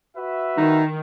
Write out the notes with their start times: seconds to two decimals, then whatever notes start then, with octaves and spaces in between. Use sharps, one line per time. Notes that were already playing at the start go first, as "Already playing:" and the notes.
0.15 F#4 B4 E5
0.57 D#3 D#4